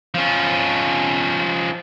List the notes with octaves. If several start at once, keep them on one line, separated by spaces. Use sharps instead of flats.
F3 C#4